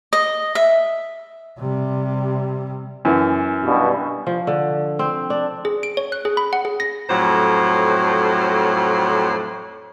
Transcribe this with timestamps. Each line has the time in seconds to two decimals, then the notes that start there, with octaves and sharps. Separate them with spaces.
0.13 D#5
0.55 E5
1.59 C3 G3
3.05 F#2 E3
3.65 G2 B2
4.27 F3
4.47 D3
4.99 C4
5.30 D4
5.65 G#4
5.83 D7
5.97 C#5
6.12 F#6
6.25 G#4
6.37 B5
6.53 F#5
6.65 G#4
6.80 A#6
7.09 F2 A2 F#3 C5